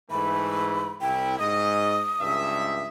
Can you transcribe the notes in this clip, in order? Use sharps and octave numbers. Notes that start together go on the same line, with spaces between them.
G#2 E3 A3 B5
C2 E4 G5
G#2 D#5 D#6
C#2 G2 E5